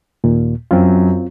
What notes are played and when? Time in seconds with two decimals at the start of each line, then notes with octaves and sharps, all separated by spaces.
0.24 D#2 A#2
0.71 F#2 C4 F4